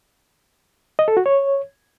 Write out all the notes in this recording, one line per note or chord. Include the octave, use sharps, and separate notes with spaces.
D#5
A4
F#4
C#5